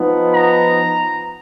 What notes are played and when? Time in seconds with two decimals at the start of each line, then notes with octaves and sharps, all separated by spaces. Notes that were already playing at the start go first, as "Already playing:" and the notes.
Already playing: F3 B3 D#4
0.34 A#5